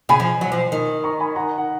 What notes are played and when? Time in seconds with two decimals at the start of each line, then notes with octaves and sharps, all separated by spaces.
0.09 C#3 G#5 B5
0.20 F3
0.41 F#3
0.52 F3
0.72 D#3
1.04 A#5 C#6
1.20 G#5 B5
1.36 F#5 A#5
1.58 F#5